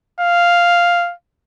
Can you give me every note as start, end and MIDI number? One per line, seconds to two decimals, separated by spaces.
0.21 1.13 77